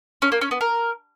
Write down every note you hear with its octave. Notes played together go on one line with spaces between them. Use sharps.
C#4
A#3
C#4
B3
A#4